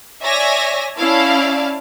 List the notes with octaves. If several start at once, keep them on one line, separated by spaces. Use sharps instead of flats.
C#5 D5 E5 G#5 A#6
C#4 E4 D5 F5 A5